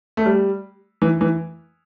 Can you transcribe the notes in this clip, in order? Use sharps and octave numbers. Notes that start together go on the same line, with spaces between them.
A3
G3
E3
E3